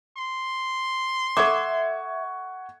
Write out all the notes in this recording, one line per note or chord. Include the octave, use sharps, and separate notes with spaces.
C6
A4 E5 F#5 C#6 D6 G#6